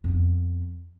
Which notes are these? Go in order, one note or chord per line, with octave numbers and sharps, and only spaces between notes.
F2 B3